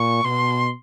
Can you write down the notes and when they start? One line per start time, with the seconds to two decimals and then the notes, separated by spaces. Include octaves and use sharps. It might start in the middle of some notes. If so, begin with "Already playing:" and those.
Already playing: A#2 C#6
0.24 B2 C6